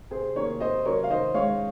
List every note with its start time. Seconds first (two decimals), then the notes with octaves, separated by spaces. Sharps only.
0.11 C3 G#4 C5
0.35 D#3 A#3 C#4 A#4 C#5
0.60 C3 C5 D#5
0.85 F#3 C#4 A#4 C#5
1.04 F5
1.10 D#3 C5 D#5
1.34 G#3 C#4 C#5 F5